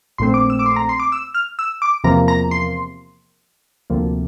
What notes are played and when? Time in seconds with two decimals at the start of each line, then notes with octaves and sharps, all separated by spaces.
0.18 A#1 A#2 A3 C4 C6
0.34 D6
0.50 E6
0.59 D6
0.66 C6
0.76 A#5
0.89 C6
1.00 D6
1.12 E6
1.34 F6
1.59 E6
1.82 D6
2.04 E2 C3 F3 A#3 A#5
2.28 A#5
2.51 C6
3.90 D2 C3 F3 A#3